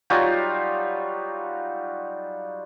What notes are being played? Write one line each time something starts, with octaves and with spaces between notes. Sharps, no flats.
F#3 G3 D#4 F4